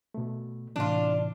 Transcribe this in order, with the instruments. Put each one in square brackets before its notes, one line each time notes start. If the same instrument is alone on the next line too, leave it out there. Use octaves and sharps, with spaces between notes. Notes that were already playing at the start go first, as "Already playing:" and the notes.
[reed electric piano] B2 A3
[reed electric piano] A2 C3 E3 [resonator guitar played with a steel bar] D4 F4